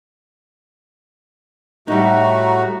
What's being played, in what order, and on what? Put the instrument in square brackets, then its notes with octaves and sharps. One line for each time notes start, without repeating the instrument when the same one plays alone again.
[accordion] A2 A3 F#4 [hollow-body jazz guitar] G3 D#4 [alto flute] A#5